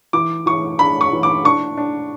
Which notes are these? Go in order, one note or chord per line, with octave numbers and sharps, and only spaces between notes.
E3 D6
E3 C#6
D4 B5
C#6
E3
D6
D4 C#6
D4